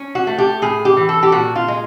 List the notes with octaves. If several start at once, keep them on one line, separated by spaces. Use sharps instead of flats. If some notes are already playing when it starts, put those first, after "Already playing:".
Already playing: C#4
F#4
A3
G4
A2 G#4
G4
E3
A4
G4
A#2 F#4
F4
G#3